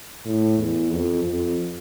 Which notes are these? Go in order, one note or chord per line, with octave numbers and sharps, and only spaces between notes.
A2
E2
F2
F2